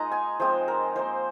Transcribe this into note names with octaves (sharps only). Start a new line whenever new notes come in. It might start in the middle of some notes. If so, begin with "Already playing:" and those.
Already playing: G#3 A#3 D#4 F4 A#5
G#5
F3 G#3 C4 C5
A#4
A#3 F4 C5